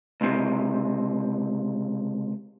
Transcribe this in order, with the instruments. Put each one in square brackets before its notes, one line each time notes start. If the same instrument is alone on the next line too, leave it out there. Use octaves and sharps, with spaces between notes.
[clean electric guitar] C#2 C3